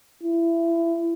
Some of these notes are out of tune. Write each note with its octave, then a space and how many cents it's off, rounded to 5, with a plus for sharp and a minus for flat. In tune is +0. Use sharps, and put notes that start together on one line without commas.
E4 +25